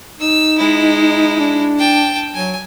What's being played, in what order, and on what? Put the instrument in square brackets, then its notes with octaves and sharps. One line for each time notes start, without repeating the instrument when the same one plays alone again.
[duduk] D#4 [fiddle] E6
[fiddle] G#3 E4
[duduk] D4
[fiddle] G5 A5
[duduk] F#3 [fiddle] G#5